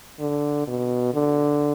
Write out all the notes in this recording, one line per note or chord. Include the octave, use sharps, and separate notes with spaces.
D3
B2
D3